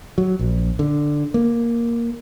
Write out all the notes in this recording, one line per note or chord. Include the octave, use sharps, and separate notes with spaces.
F#3
A#1
D3
A#3